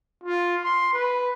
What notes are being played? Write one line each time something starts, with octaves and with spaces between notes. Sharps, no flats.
F4
C6
B4